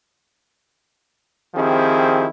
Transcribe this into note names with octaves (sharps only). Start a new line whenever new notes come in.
D#3 F3 C4 E4 G4 G#4